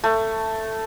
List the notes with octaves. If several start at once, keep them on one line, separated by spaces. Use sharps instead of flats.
A3